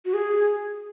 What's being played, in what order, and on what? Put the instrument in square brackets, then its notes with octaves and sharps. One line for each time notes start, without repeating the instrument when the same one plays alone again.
[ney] F#4
G#4